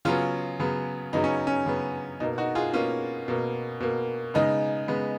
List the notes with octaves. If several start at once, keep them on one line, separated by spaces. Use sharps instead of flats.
C#3 F#3 B3 C#4 F4
C#3 F#3 B3
C#3 F#3 B3 D#4
C#4
C#4
C#3 F#3 B3
B2 A#3 D#4
D#4 F#4
F4 G#4
B2 A#3 C#4 F4
B2 A#3
B2 A#3
C#3 G#3 B3 D#4
C#3 G#3 B3